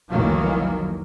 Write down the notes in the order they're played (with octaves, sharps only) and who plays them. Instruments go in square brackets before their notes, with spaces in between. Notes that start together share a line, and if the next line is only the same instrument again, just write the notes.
[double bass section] F1 C2 D#3 E3 F#3 A#3